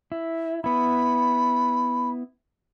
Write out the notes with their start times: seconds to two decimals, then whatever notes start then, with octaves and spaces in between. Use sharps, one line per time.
0.12 E4
0.64 B3 E4 B5